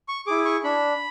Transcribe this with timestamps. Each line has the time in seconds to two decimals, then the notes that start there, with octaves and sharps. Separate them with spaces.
0.08 C#6
0.27 E4 G#4 D6
0.45 C#6
0.64 D4 B5